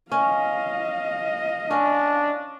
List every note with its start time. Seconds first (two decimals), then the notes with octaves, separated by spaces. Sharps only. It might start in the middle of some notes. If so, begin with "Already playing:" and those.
0.12 C#4 D#5 F5
1.71 C#4 D4